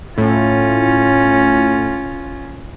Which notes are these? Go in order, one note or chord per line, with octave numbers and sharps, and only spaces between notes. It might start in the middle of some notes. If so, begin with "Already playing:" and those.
A2 C#4 F4